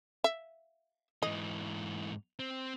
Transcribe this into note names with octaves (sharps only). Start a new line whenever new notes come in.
E5
G#2 E3 D#5
C4